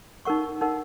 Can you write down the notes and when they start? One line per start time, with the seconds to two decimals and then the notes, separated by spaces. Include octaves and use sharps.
0.25 D#4 A#4 F#5 C#6
0.61 D#4 A#4 F#5